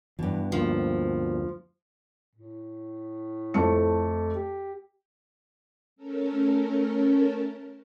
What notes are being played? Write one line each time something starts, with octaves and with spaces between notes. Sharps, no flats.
G2 B2 E3
D2 F3 A#3
A2
F2 A3 C#7
G4
A3 C#4 A4 A#4